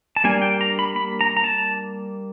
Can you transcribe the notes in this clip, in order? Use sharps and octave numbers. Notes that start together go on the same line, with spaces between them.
A5
G3 A#3 D4 G#5
G5
A#5
B5
B5
A#5
A#5
A5